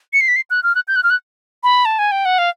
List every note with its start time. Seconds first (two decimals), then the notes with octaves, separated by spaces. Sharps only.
0.13 C#7
0.21 C7
0.28 B6
0.36 C7
0.50 F#6
0.63 F6
0.75 F#6
0.88 G6
0.96 F#6
1.03 F6
1.10 F#6
1.63 B5
1.85 A5
1.99 G#5
2.11 G5
2.25 F#5
2.38 F5